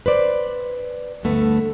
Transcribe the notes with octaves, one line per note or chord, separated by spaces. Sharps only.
B4 C5 D5
D2 G2 D3 A3 B3